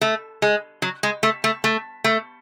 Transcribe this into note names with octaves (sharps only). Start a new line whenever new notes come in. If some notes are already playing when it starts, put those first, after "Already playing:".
A3
G#3
F#3
G#3
A3
A3
A3
A3